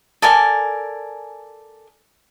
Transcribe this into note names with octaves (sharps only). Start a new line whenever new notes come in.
A4 A#4 D5 G#5